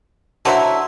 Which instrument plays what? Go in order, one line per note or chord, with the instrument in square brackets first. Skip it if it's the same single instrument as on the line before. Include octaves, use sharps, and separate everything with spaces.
[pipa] D3 F#3 E4 [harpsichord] F#4 C5 E5